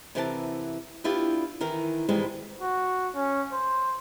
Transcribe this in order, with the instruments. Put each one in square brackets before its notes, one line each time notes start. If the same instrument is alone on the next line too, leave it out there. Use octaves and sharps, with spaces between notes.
[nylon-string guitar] C3 E3 A#4 F#5 G5 A5
B3 D4 E4 F4 G4
D#3 E3 A#4
G#2 B2 D#3 E3 G3 G#3
[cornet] F#4
C#4
C5